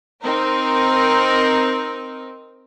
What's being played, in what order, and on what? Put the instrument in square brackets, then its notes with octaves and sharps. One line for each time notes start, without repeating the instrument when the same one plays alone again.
[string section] C4 D#4 A#4